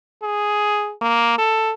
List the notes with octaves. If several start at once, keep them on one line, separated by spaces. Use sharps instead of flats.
G#4
A#3
A4